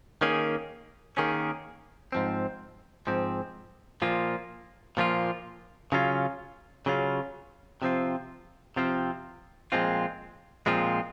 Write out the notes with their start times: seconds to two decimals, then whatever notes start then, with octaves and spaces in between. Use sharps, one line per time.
0.21 D#3 A#3 C#4 G#4
1.17 D#3 A#3 C#4 G#4
2.12 G#2 F3 C4
3.07 G#2 F3 C4
4.02 A#2 F3 A#3 F4
4.97 A#2 F3 A#3 F4
5.92 C#3 F#3 C#4 F4
6.86 C#3 F#3 C#4 F4
7.82 C3 F3 C4 F4
8.76 C3 F3 C4 F4
9.72 A#2 F3 G#3 C4 F4
10.66 A#2 F3 G#3 C4 F4